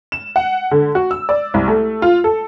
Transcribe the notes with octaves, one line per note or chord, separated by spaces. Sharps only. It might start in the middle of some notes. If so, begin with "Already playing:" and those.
E7
F#5
D3
F#4
E6
D5
C2
A3
F4
A4